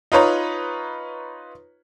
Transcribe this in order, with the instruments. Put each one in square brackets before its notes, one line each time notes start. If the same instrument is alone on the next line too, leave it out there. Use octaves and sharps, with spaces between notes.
[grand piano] D#4 F4 B4 C#5 A#5